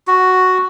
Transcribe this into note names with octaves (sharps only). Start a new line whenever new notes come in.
F#4